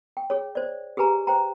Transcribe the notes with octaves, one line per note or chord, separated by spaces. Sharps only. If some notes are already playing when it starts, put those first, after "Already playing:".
G5
G#4 C#5
C5 D5
G4 G#4 B4 G#5 A#5
C5 G5 A#5